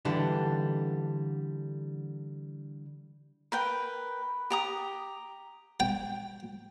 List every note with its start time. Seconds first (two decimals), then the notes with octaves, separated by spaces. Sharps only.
0.05 D3 E3 G3 D4
3.52 A#4 B4 G5
4.50 G4 A#5 D#6
5.80 G5